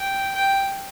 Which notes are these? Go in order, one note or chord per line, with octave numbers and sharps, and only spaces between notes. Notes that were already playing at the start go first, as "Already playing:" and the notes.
Already playing: G5
G5